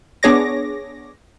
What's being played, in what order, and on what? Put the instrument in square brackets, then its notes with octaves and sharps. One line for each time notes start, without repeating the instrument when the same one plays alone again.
[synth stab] B3 D4 G#4 C#5 D6 A#6